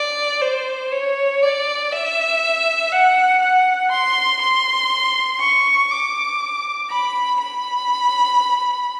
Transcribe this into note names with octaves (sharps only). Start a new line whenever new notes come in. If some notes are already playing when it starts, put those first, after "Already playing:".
Already playing: D5
C5
C#5
D5
E5
F#5
F#5
C6
C6
C#6
D6
B5
B5